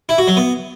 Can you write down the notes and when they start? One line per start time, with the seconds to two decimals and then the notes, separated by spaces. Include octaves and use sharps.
0.09 E4
0.18 F#4
0.28 F#3
0.37 B3